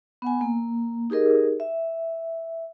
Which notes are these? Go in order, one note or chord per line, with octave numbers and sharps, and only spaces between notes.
B3 F#5 G#5
A#3
D#4 G4 G#4 A#4 D#5
E5